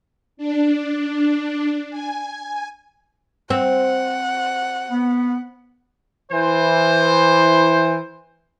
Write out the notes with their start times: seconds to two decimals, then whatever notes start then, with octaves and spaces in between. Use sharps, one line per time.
0.37 D4
1.90 G#5
3.50 C4 F#5
4.91 B3
6.32 E3 C5